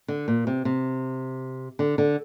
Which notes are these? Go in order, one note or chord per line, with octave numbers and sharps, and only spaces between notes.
D3
A#2
C3
C3
D3
D3